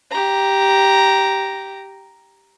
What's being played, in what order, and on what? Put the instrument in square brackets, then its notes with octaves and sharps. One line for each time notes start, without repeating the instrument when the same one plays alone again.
[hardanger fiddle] G4 A#5